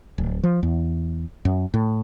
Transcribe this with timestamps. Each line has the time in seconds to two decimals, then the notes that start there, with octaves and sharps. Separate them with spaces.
0.18 D1
0.43 F3
0.63 E2
1.45 F#2
1.74 A2